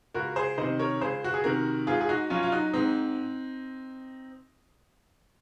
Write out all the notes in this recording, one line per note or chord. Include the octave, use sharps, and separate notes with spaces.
C#2 F#4 A#4
G#4 C5
C3 D#3 C5 D#5
A#4 C#5
C#2 G#4 C5
F#4
G#4
C3 D#3 F#4 A#4
G#2 F4 G#4
G#4
D#4 F#4
F#3 C#4 F4
F4
D#4 F#4
G#2 C4 D#4